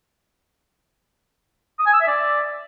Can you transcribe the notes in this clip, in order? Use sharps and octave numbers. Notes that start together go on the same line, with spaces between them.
D#6
G#5
E6
E5
D5